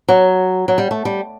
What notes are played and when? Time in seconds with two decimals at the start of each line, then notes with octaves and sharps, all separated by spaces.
0.09 F#3
0.68 F#3
0.78 G3
0.91 A3
1.05 G3